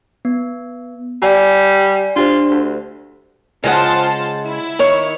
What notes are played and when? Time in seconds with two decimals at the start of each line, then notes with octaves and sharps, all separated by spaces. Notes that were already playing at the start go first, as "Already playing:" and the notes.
0.25 B3
1.22 G3 D5 G#5
2.16 D4 F4 G4 C5
2.51 D2
3.64 C#3 G#3 F4 C5 F#5 A5
4.45 E4
4.79 D#3 C#5